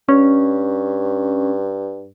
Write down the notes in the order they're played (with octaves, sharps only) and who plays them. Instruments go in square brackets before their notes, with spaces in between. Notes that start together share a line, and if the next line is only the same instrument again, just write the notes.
[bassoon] G2 [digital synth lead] C#4